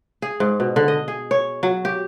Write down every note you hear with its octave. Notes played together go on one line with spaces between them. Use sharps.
G#4
G#2
B2
D3
D#5
G#4
C#5
F#3
G4